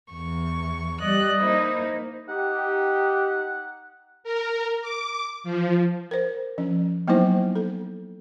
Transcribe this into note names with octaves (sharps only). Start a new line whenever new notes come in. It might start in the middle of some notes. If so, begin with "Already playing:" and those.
E2 C#6
G3 D5 D#5 F#6
A#3 D#4 E4 C5
D#4 G4 F#5
A#4
D6
F3
A#4 C5
F3 C#4
F#3 A#3 B3 D#4 E4 C5
A4